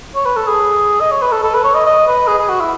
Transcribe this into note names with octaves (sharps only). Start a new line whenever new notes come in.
C#5
B4
A4
G#4
D#5
C#5
B4
A4
A4
B4
C#5
D#5
D#5
B4
G#4
G#4
F#4
E4